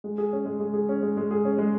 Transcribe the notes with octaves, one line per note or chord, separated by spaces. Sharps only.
G#3
G#4
C#4
G#3
G#3
G#4
C#4
G#3
G#3
G#4
C#4
G#3